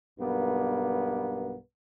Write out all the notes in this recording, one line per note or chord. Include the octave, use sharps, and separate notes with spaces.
B1 G2 A#3 B3